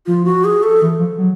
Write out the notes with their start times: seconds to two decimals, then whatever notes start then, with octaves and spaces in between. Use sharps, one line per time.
0.06 F3 F4
0.25 F#4
0.45 G#4
0.63 A4
0.82 E3
0.99 F3
1.18 F#3